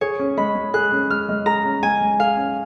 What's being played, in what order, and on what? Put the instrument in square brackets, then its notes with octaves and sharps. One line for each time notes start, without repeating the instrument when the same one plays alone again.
[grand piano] G#4 [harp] C#5
[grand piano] C#4
[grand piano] G#3 [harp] B5
[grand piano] G#3
[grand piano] G#4 [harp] F#6
[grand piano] C#4
[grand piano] G#3 [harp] F6
[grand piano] G#3
[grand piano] G#4 [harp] A#5
[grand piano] C#4
[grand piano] G#3 [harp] G#5
[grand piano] G#3
[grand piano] G#4 [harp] F5
[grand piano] C#4